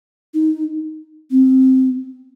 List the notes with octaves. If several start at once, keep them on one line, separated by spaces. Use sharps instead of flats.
D#4
C4